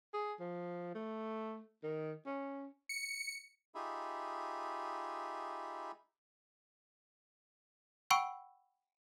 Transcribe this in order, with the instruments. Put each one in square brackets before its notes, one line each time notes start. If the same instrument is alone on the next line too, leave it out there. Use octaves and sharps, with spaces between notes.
[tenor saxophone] G#4
F3
A3
D#3
C#4
[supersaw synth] C#7
[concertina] D#4 F4 G4 G#4 E5 B5
[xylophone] F#5 G5 B5 C#6 E6 D7